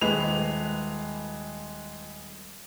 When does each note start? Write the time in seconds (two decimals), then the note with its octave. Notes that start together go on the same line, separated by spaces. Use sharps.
0.01 D#1 G#3 B4 F7